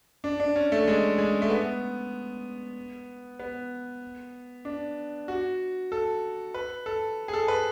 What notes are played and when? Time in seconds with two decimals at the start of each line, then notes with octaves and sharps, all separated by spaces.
0.24 D4
0.40 D4
0.56 C#4
0.72 A3
0.88 G#3
1.18 G#3
1.42 A3
1.50 B3
3.40 B3
4.65 D4
5.28 F#4
5.92 A4
6.54 B4
6.86 A4
7.28 G#4
7.33 A4
7.48 B4